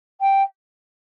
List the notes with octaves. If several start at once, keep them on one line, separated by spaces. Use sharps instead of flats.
G5